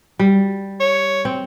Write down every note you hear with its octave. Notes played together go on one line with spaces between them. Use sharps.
G3
C#5
C4